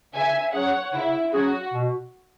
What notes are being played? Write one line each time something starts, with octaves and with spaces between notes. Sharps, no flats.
C#3 E5 G#5
F#3 C#4 G#4 C#5 F#5
C#3 E4
F#3 C#4 F#4 G#4
B2